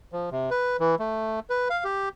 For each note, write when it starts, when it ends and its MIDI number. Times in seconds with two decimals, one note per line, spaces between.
0.12 0.30 53
0.31 0.50 48
0.51 0.77 71
0.80 0.95 52
0.99 1.40 57
1.50 1.68 71
1.70 1.84 77
1.84 2.09 67